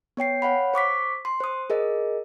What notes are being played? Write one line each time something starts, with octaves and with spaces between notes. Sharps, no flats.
B3 C#5 G5 C7
C#5 F5 F#5 B5
C5 C#6 D6 B6
C6
C5 D#6
G#4 A#4 D#5